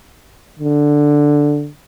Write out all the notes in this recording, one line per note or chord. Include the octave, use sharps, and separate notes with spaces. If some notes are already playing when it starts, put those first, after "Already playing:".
D3